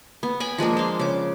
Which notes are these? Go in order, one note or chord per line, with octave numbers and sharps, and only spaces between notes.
B3
G5 G#5 B5
F3 G#3 A#3 D4
C5 F5
C#3 D6